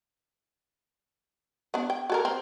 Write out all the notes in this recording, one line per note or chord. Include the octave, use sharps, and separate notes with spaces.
B3 D4
G5
F#4 A4 A#4
C4